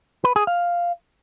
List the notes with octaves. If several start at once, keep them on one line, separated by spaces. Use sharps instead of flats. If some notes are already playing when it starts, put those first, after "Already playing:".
B4
G#4
F5